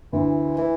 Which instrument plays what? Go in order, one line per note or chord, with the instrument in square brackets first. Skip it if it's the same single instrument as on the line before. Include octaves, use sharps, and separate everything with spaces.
[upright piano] D2 [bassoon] E3
[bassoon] E3